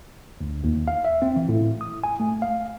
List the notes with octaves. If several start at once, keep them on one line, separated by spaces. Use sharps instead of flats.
D2
D#2
F5
E5
C4
E3
A2
D#6
G#5
A3
F5